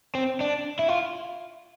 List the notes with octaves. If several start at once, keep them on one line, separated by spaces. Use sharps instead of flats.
C4
D4
E4
F4